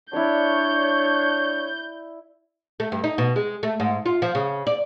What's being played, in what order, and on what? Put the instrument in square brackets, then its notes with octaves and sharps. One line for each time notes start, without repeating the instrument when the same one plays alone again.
[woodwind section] D4 C#5 [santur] E4 D5 [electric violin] G6
[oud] A3
G2
D#4
B2
G#3
A3
G#2
F4
F3
C#3
D5